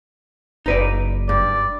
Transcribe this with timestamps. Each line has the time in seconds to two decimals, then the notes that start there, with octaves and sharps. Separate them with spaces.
0.66 F#1 D#4 B4 D5
1.29 G2 D5